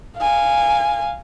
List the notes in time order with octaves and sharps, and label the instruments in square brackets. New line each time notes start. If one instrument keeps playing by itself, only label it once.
[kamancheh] F5 G#5